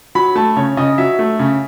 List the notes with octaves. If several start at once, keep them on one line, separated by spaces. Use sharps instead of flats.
F#3 B5
A3 A5
C#3 C#5
C#3 D#5
F#3 E5
A3
C#3